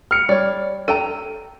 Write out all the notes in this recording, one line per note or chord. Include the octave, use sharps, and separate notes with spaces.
F6 C#7
G3 C#5 D5
A4 G5 A#5 D#7